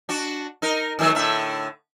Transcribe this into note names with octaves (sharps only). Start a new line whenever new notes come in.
D4 F#4
D#4 A#4
D#3 F#3 A3
A2 D3 E5